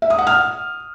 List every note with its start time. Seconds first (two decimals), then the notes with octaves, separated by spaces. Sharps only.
0.02 E5
0.10 D#6
0.19 F#5
0.27 F6